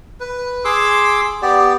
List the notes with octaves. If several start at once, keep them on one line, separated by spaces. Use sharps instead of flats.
B4
G#4 C6 D6 E6
B3 G4 D5